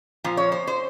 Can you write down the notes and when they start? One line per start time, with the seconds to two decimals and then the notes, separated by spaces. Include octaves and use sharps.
0.24 A#2 F3
0.37 C#5
0.52 C5
0.67 C5